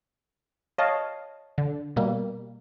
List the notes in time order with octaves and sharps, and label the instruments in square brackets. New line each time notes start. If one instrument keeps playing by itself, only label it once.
[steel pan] C#5 F5 A5 [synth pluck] D#5
[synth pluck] D3
B2 G3 A#3